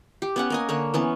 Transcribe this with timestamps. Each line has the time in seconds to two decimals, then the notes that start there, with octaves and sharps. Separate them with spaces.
0.22 G4
0.36 B3 C#4 F#5
0.50 A#3 D#5 G#5
0.69 D3 A#3 C#5
0.94 E3 B3 C#4